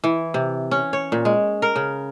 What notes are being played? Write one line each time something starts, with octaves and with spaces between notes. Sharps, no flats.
E3
C3
C#4
C#5
A#2
G#3
A#4
C#3